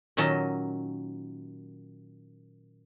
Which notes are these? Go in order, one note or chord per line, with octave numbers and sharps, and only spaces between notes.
A#2 D#3 F#3 C#4 D#5 A5